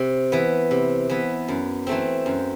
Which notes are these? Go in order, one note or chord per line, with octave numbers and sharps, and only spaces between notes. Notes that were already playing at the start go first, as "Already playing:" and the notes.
Already playing: C3
E3 B3
C3
E3 B3
F#2
E3 A3 C4
F#2